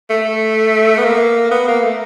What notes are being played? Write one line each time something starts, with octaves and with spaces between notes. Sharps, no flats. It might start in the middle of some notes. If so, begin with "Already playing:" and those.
A3
B3
A#3
B3
A#3
A3